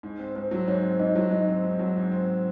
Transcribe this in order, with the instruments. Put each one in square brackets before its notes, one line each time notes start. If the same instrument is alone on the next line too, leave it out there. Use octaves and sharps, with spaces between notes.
[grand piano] G#2
C4
[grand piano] G#2 [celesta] C5
[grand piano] F#3
[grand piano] G#2 [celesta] C#5
[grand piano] C4
[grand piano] G#2 [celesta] D#4 D#5
[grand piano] F#3
[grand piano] G#2 [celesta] D#4 D#5
[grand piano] C4
G#2
F#3
G#2
C4